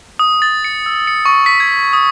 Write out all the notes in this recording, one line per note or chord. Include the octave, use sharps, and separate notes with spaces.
D#6
A6
C#7
E6
C#7
C#6
B6
G#6
D#6